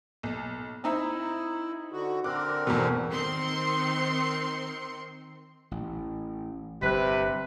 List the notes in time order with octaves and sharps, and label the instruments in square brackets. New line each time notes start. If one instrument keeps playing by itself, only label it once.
[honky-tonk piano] B1
[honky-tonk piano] C4 D#4 E5 [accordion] E4
[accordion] D3 F#4
[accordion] D3 C4 A#4 [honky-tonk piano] D6 F#6
[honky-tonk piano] E2 G#2 B2
[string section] D#3 C4 C6 C#7
[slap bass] A1
[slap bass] G1 G3 [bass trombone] C3 [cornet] B4 [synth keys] F#6 B6